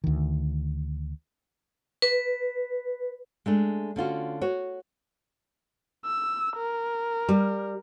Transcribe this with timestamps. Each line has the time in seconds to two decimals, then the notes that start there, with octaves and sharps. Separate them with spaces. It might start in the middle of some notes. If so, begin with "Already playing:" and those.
0.04 D2 D#3
2.02 B4
3.46 G#3 A3 D4
3.96 D3 C#4 F4 F#4
4.41 F#4 C#5
6.05 E6
6.57 A#4
7.29 G3